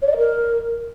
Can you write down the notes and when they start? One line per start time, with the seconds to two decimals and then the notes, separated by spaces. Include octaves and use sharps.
0.02 C#5
0.07 D5
0.12 D#5
0.17 A#4